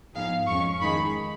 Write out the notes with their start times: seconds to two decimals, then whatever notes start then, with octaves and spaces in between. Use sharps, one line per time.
0.14 G#2 F3 B3 D#4 G#4 F5
0.47 F2 F3 G#3 C#4 C#6
0.81 D#3 G#3 D#4 G#4 B5